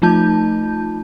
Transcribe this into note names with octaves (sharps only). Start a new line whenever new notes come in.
F3 A3 D#4 F4 A5 G6